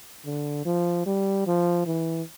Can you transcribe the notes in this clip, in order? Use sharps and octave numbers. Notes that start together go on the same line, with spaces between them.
D3
F3
G3
F3
E3